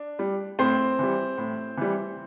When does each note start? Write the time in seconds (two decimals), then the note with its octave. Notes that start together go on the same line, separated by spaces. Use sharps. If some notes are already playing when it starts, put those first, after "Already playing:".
Already playing: D4
0.19 G3
0.59 A2 C4 C5
0.99 E3 G3
1.38 A2
1.77 E3 G3